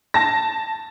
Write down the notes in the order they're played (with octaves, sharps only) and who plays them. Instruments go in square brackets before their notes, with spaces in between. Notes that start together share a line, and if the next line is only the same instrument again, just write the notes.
[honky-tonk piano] A5 A#6